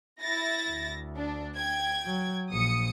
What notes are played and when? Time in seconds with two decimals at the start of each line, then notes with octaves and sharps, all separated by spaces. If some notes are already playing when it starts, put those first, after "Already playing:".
0.20 E4 A6 A#6
0.69 D2
1.17 D4
1.57 G5 G#6
2.06 F#3
2.51 A#1 D#6 C#7